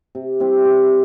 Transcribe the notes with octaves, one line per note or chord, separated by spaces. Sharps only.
C3
G3 C4 E4
C3